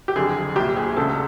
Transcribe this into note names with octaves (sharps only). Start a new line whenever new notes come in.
G4
F#1 F2 D3 G#4
C2 A#2 G4
G#4
E1 D2 C#3 A4